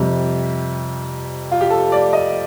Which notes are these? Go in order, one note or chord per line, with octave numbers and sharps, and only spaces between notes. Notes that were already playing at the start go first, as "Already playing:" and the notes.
Already playing: F2 C3 G3 G4
F4
G4
A4
D5
D#5